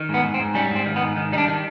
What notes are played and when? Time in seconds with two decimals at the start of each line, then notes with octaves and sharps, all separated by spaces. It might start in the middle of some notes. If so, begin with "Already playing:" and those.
Already playing: D#3
0.09 G#2 B3
0.24 G#2
0.34 C4
0.40 G#2
0.55 G3 C#4
0.71 G#2 C4
0.86 D#3
0.96 B3
1.02 G#2
1.17 D#3
1.32 G3 D#4
1.38 D4
1.48 D#3